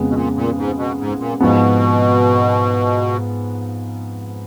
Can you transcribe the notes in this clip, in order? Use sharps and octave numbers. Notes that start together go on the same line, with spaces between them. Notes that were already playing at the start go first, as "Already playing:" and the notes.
Already playing: F2 C#3 G#3 B3
B2
A#2
A#2
G#2
B2
G#2
A#2
G#2 B2 F3 B3